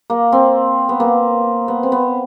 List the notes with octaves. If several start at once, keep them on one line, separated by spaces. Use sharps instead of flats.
A#3
C4
B3
A#3
B3
C4
B3